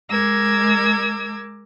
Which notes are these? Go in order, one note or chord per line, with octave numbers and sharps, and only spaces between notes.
G#3 A#4 D6 E6 G#6